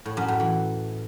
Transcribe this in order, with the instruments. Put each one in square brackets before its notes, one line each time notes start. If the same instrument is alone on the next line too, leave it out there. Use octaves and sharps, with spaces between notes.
[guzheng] A2
F#2
A2
E3